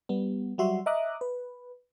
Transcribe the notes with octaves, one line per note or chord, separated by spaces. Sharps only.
G3 B3
F#3 G3 F#4 E5 C6
D#5 E5 A#5 D6 D#6 F#6
B4